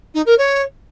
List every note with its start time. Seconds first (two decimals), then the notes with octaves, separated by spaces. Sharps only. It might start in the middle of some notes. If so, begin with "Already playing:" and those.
0.14 D#4
0.26 A#4
0.38 C#5